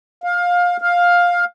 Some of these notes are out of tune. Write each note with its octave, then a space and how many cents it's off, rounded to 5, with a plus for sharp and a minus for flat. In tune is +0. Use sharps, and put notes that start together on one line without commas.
F5 +20
F5 +10